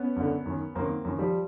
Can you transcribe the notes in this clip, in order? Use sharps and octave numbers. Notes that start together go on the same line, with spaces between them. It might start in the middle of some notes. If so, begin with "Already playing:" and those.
Already playing: B3 C#4
F#2 D3
F#2 D#3
F#2 D#3 A#3 C4
F#2 D#3
F3 G3